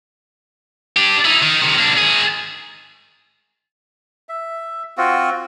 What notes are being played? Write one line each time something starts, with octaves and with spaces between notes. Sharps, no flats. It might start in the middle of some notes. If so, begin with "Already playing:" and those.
D4 G4
D#4 E4
D#3
C3 D#3
A#3 D4
D#3 G#4
E5
C4 F4 F#4